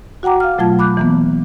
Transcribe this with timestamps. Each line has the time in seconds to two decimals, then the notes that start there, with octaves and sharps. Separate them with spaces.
0.23 F#4 F#5 G5 A#5 D6
0.40 F5 F6
0.58 B2 F#3 A3 F4 A5 G#6
0.79 B5 D6 F#6 G6
0.97 E3 A#3 B3